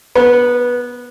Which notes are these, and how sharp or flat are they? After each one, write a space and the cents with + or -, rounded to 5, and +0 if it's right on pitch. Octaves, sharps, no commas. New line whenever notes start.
B3 -15